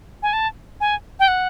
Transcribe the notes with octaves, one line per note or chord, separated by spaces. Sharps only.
G#5
A5
G#5
G5
F#5